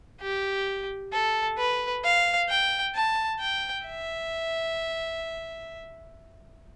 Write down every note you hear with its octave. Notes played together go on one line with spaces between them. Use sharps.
G4
A4
B4
F5
G5
A5
G5
E5